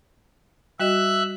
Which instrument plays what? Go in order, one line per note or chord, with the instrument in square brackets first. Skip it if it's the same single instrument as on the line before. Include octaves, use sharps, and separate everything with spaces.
[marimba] G3 F#4 D#5 [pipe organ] E5 F#6